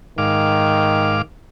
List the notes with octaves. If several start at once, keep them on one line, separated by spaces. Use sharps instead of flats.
G#2 D#3 F5 D6